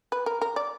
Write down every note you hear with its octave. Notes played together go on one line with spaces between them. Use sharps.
B4
A#4
A#4
D5